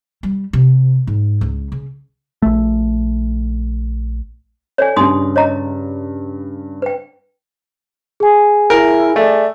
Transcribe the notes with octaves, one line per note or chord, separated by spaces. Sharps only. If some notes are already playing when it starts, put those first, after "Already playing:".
G3
C3
G#2
C#2
C#3
A#1 A3
A4 C#5 D5 G#5
G2 C#3 D#4 C6 D#6
C#5 D#5 A#5
B4 G5
G#4 G#5
E4 A#4
A3 D5